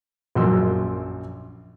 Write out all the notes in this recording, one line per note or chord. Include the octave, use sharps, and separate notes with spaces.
A#1 F#2 C6 E6